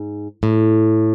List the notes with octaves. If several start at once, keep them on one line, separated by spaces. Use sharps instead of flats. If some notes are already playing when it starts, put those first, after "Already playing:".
Already playing: G#2
A2